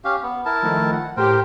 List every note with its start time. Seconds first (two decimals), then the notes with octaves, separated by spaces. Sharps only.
0.04 C#4 G4 F5
0.23 B3
0.45 E4 A#4 A5
0.62 D#3 F3 A3
0.92 F#5
1.17 A2 G4 A#4 C5 G5